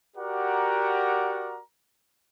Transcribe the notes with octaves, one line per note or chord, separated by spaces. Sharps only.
F#4 G4 A#4 D5 F#5 A#5